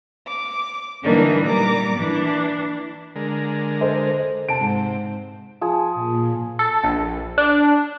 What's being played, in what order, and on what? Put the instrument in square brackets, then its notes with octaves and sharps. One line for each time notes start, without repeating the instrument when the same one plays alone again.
[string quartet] D6
D3 E3 G3 A#3 D4 D#4
A#2 G3 A#3 A#5 D6
E3 D4
[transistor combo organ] D3 G#3 A#4
[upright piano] A4 C5 D#5
[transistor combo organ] C3 [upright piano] A5 D7
[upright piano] G#2
[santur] F3 G#4
[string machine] A#2
[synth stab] A4
A#1
D4